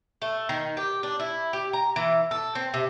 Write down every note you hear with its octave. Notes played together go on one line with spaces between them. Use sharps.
A3
D#3
G4
D4
E4
G4
A#5
E3
A4
C4
C3